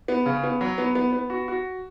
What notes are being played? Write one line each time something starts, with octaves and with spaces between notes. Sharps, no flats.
B3
C#3
B3
F#3
B3
B3
B3
F#4
F#4